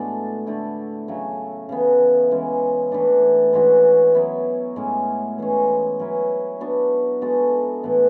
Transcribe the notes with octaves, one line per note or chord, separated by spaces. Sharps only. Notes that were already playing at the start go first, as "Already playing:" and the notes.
Already playing: A2 G#3 B3 D4 F#4 A4
D3 A3 E4
C#3 F#3 A3
C#3 E3 B3
E3 G#3 C#4
E3 A3 D4
E3 G#3 C#4 F#4
F#3 B3 E4
A2 G#3 C#4
E3 G#3 C#4
F#3 C#4 E4 B4
B3 D4 F#4
G#3 B3 F#4 A4
A2 E3 B3 E4